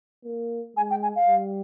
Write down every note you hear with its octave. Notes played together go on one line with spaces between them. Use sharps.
A#3
G#3 G#5
G5
G#5
F5
G3